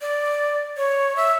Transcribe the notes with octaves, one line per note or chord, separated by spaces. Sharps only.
D5
C#5
E5